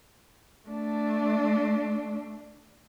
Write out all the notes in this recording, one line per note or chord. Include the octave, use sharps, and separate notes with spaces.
A3 D4